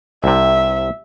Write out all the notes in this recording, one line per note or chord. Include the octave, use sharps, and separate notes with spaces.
C2 C3 E5